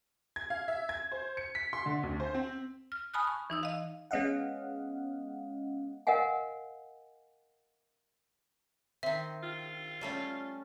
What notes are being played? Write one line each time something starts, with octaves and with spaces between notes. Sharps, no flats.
G#6
F5
E5
G#6
C5
C#7
B6
C6
D3
D2
C5
C4
F6
G#5 A5 B5 D#6 F6 F#6
C#6
E3 D#4 E6
D#5 F5
G#3 B3 C#4 D#5 F5 F#5
A#4 D#5 F5 F#5 G#5
D#3 C4 E5
F4
G3 A3 C#4